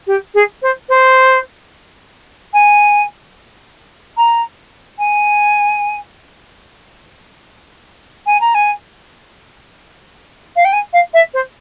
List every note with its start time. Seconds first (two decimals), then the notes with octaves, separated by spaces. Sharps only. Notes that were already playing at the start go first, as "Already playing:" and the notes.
0.07 G4
0.34 G#4
0.62 C5
0.89 C5
2.53 G#5
4.17 A#5
4.98 G#5
8.26 G#5
8.40 A#5
8.54 G#5
10.56 F5
10.64 G5
10.72 G#5
10.93 F5
11.13 E5
11.33 C5